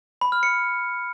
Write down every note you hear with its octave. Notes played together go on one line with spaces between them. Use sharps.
B5
F6
C#7